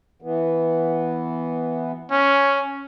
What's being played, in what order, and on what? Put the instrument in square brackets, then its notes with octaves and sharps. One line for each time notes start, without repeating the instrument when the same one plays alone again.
[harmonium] E3 B3
[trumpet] C#4